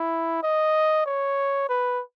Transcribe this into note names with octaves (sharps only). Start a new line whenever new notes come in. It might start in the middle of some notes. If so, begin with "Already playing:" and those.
Already playing: E4
D#5
C#5
B4